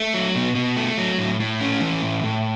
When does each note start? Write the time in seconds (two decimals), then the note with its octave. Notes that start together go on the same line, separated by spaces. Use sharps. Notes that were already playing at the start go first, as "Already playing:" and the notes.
Already playing: A3
0.14 F#3
0.35 B2
0.55 B2
0.77 A3
0.98 F#3
1.18 A2
1.40 A2
1.61 C#4
1.81 E3
2.02 A2
2.23 A2